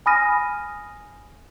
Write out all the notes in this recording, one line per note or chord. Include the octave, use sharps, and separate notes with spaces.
G#5 B5 D#6 F6 A#6 D#7